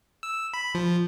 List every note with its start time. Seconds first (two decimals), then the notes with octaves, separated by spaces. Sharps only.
0.23 E6
0.53 B5
0.75 F3